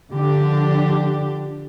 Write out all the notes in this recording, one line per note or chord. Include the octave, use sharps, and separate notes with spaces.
D3 F3 D4 G4